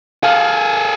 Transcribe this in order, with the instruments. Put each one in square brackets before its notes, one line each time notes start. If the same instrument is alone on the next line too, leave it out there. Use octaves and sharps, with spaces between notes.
[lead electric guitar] G#4 A4 [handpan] F5